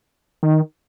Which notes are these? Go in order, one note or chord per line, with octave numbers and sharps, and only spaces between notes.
D#3